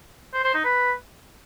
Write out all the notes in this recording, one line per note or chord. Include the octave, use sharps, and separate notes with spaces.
C5
C5
D#4
B4